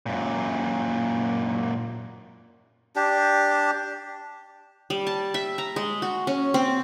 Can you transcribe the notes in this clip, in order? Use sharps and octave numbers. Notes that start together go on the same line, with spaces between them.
F#2 A#2
D4 G4
G3
A5
E5
A#5
G#3
F#4
C#4
C4